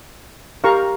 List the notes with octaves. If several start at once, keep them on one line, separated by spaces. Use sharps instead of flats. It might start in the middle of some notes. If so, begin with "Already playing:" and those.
G4 A#4 F5 A#5 C#6